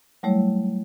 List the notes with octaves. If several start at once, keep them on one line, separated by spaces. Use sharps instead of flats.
F#3 G3 A3 E4 C#5